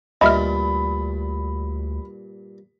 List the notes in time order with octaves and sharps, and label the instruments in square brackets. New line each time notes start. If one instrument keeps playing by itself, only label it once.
[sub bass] D2 [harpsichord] G2 A#2 [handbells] D#5 E5 F6 [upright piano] B5